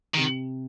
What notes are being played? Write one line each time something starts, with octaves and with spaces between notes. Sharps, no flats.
C3 D#3